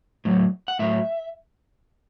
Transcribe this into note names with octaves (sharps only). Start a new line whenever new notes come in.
A2 F#3
F#5
A2 F#3 E5